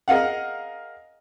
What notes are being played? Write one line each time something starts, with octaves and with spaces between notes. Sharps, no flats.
G#4 A#4 D#5 F5 F#5